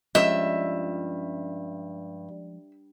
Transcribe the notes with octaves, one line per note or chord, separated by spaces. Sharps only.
G2 F3 G#3 C#4 D#5 E5 E6